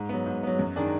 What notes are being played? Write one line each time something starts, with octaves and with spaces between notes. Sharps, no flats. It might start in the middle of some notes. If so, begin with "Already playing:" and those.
Already playing: G#2
F#3 B3
G#2
F#3 B3
F#2
D#3 G#3 D4 G#4